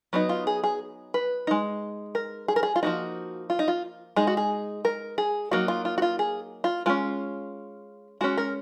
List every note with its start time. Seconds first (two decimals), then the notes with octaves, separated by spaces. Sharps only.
0.13 F#3 B3 D#4
0.29 F4
0.47 G#4
0.64 G#4
1.14 B4
1.47 G#3 D#4
2.15 A#4
2.48 G#4
2.56 A#4
2.63 G#4
2.76 F4
2.83 F3 A#3 D#4 F#4
3.50 F4
3.59 D#4
3.68 F4
4.16 G#3 D#4 G#4
4.27 F#4
4.37 G#4
4.85 A#4
5.18 G#4
5.51 F#3 A#3 D#4 F#4
5.68 F4
5.85 F4
5.98 F#4
6.02 F4
6.19 G#4
6.64 F4
6.86 G#3 C#4 F4
8.21 G#3 C#4 F#4
8.37 A#4